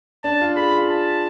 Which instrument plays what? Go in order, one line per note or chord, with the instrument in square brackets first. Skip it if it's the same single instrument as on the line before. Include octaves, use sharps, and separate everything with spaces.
[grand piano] D4 [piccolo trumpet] A5
[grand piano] F4
[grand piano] G#4 [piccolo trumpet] B5
[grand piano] F4
[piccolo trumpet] A5